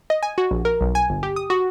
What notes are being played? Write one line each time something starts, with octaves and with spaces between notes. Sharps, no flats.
D#5
G#5
F#4
A#1
A#4
B1
G#5
G1
G4
D#6
F#4